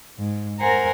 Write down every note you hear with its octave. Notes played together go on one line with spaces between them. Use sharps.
G#2
A#4 C5 F#5 G#5 A#5